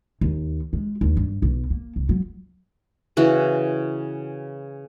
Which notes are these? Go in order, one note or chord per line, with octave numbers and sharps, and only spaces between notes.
D#2
G#3
D#2
G2
B1
A#3
C2
F#3
C#3 E3 F#4